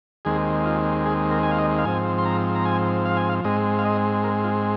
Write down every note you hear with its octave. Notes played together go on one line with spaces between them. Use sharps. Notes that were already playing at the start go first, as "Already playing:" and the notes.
D#2 D#3 G#3 C4 G#4
F4
G#4
A#4
G#5
F5
D#5
F5
G#2 F3 C4 G#5
C6
A#5
A#5
G#5
F5
G#5
F5
G#2 G#3 C4 D#5
F5
D#5
A#4
F4